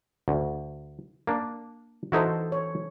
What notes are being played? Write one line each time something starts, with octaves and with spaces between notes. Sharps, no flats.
D2
A#3 D4
E3 D#4 E4 F#4 A4 C5
C#5